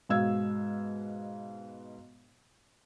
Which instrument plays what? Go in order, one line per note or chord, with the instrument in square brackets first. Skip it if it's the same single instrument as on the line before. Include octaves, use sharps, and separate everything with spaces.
[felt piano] G#2 B2 F5 E6 G#6